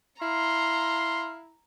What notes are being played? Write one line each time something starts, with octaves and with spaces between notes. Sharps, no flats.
E4 F5 A#5 C6